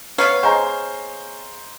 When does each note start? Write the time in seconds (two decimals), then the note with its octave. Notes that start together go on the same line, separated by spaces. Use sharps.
0.18 B3 B4 C#5 F5
0.43 G#4 C5 D#5 G#5 A#5 C#6